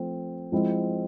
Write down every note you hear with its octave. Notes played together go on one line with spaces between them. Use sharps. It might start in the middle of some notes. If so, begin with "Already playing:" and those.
Already playing: F3 A3 C4
F3 G#3 C4 E4